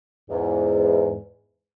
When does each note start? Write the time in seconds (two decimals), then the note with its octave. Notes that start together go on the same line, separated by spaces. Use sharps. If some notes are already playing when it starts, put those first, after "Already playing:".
0.30 E2 G#2